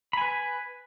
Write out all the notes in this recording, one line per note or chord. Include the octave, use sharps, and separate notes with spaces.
B4 G#5 B5